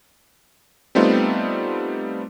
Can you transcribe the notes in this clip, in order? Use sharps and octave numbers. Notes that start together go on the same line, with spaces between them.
G3 A3 B3 C4 D#4 F4